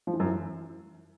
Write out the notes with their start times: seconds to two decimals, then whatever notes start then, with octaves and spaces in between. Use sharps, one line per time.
0.07 F3
0.13 E3
0.20 F#2
0.26 E3